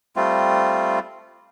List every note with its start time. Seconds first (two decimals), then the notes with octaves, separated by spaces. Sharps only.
0.16 G3 A3 C4 F4